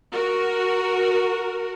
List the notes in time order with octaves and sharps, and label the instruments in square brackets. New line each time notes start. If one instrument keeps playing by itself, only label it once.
[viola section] F#4 A#4